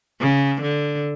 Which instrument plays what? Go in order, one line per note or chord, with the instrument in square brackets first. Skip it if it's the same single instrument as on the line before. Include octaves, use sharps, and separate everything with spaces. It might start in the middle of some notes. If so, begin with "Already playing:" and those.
[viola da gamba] C#3
D3